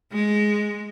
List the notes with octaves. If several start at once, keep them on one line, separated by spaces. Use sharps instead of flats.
G#3